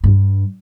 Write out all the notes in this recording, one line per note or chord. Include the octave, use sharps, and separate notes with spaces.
G2